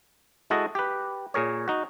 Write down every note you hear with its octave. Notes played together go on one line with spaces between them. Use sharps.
G#3 E4 F#4 A4 D#5
G4 B4
A#2 G#4 A#4 C#5
D#4 F#4